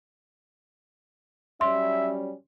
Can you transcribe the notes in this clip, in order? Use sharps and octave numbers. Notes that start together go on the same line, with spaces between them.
F#3 G3 C#4 E5 C6